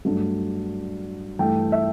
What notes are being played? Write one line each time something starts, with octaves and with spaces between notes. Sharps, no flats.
G2 F#3 A3 D4
G2 E3 A3 G5
E5